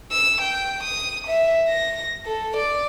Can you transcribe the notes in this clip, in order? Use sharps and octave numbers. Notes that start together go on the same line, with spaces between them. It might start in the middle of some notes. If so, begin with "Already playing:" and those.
E6
G5
D#6
E5
A#6
A4
D5